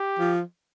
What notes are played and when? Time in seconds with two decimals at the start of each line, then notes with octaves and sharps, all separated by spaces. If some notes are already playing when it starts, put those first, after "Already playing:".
Already playing: G4
0.19 F3